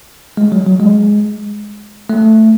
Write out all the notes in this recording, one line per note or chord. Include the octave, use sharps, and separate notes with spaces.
G#3
F#3
F#3
G#3
A3